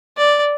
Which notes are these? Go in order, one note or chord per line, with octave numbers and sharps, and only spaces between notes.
D5